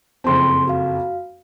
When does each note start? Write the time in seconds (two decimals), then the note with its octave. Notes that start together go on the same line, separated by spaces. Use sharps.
0.24 F#1 F2 C4 A5 C6
0.68 F#4 F5